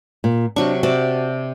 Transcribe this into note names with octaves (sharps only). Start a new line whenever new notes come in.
A#2
C3 F#3 D4 C#6
C3 F#4 D5 A5